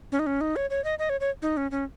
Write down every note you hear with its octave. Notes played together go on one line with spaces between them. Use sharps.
C#4
D#4
C#4
D#4
C#5
C#5
D#5
D#5
C#5
C#5
D#4
C#4
C#4